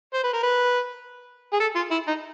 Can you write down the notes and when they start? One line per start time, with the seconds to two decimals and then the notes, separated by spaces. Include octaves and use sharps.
0.14 C5
0.24 B4
0.33 A#4
0.43 B4
1.53 G#4
1.60 A4
1.75 F4
1.91 E4
2.07 D#4